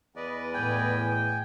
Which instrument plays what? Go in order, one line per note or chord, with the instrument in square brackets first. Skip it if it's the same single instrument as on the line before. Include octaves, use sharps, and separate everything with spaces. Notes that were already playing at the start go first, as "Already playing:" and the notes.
[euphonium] E2 [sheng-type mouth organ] B4 D5 D#5
[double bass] A2 [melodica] G5 G#5